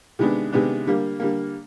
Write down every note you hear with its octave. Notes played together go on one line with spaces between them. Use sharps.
C3 D#3 G#3 B3 D4
C3 D#3 G#3 B3 D4
D3 G3 A#3
D3 G3 A#3